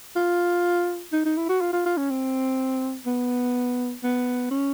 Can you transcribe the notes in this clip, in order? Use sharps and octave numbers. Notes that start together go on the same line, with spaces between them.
F4
D#4
D#4
E4
F#4
F4
F4
F4
C#4
C4
B3
B3
C#4